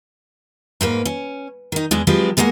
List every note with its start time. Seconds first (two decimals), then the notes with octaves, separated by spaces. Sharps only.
0.81 G#2 A#3 B4
1.05 C#4
1.72 D#3 D#4
1.91 E2 G#3 D4 G#4
2.07 F3 F#3 G#3 C4 G4 B4
2.37 B2 G#3 A#3 A#4 F#5